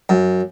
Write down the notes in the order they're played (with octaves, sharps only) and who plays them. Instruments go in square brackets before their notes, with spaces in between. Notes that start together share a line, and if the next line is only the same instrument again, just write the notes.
[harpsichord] F#2